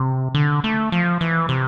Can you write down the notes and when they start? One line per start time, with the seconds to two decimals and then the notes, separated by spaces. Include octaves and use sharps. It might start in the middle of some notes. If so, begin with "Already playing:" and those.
Already playing: C3
0.34 D3
0.64 A3
0.92 F3
1.21 E3
1.49 C3